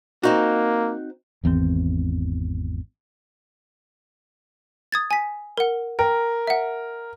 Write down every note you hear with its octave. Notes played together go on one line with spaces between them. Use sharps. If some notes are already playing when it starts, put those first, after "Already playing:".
A#3 C4 D#4 F#4
G#1 E2 C3 C4
D#6 G#6 A6
G#5 B6
A#4 F#5
A#4 G5
E5 F#5